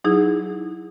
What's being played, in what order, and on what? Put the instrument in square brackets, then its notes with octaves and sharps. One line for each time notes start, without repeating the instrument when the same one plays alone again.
[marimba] F#3 D#4 E4 G#4